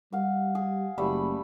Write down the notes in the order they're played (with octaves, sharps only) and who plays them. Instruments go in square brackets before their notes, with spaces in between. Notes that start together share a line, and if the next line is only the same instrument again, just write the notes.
[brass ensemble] G3 [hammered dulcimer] F5 F#5
[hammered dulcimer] G#4
[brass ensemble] F#1 [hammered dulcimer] G3 A3 B5